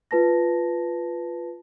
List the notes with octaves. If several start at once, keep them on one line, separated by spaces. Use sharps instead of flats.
F4 B4 A5 A#6